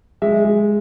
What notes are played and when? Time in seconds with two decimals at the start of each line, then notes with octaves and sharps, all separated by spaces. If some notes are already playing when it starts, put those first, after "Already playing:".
0.22 G#3 E5
0.45 G#3